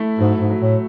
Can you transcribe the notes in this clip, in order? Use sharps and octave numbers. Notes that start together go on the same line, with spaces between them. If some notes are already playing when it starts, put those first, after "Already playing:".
Already playing: A3 E4
G#2 F#3
G#2
F#3
A2